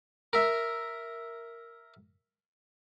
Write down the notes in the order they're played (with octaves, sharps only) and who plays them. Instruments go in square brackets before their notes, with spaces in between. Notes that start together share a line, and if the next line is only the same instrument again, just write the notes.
[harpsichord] A#4 E5